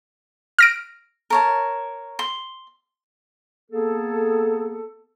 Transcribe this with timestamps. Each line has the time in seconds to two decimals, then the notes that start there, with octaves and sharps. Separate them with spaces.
0.59 F6 A#6 D7
1.30 A#4 C#5 A5
2.19 C6
3.71 A#3 B3 G#4 A4